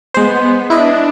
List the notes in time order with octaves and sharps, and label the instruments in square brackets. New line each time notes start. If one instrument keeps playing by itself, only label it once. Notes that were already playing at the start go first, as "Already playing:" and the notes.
[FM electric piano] G#3 C5 [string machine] B3
[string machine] D4 [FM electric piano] E4 B4 D#5